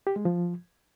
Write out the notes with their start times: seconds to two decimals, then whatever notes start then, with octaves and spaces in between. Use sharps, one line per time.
0.07 G4
0.16 G#3
0.25 F3